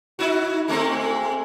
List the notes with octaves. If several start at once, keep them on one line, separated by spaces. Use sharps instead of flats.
D#4 E4 F#4
G#3 A3 C4